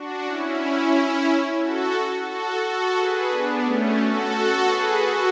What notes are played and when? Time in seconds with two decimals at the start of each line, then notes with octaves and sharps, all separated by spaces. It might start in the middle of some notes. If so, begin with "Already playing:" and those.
Already playing: D4 F#4
0.25 C#4 E4
1.60 F#4 A4
2.28 F#4 A4
2.62 F#4 A4
2.96 G#4 B4
3.29 B3 D4
3.64 A3 C#4
3.97 F#4 A4
4.65 G#4 B4
4.99 F#4 A4